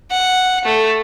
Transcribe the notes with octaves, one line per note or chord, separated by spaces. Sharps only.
F#5
A3